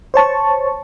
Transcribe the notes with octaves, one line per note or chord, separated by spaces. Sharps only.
C5 C#5 A5 C#6